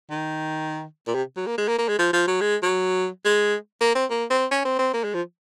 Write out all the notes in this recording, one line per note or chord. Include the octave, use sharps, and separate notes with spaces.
D#3
A#2
C3
F#3
A#3
G#3
A#3
A#3
G#3
F3
F3
F#3
G#3
F#3
G#3
A#3
C4
A#3
C4
C#4
C4
C4
A#3
G#3
F3